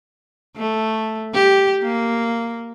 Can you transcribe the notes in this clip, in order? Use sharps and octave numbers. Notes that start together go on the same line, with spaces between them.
A3
G4
A#3